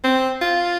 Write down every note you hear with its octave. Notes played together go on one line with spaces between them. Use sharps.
C4
F4